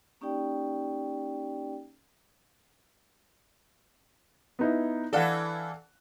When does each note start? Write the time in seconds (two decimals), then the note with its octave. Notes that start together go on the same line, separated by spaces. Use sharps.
0.21 A#3 C#4 D#4 G4 D5 G5
4.59 B3 D#4 E4
5.13 E3 A4 D5 F5 F#5